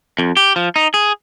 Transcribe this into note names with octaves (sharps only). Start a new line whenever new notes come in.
F2
G4
F3
D#4
G#4